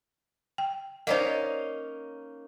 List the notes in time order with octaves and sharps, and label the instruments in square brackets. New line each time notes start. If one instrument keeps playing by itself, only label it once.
[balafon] G5
[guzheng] A#3 C#4 D#4 [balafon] C5 D5 D#5